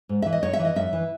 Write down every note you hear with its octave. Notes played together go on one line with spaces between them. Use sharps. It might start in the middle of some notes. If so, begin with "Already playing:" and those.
G#2
E3 E5
D#5
F#2 C#5
E5
E3
D#5
F#2 E5
E3